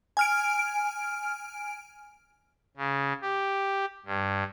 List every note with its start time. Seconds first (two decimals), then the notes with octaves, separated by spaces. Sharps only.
0.17 G#5 F6 D7
2.77 C#3
3.21 G4
4.06 G2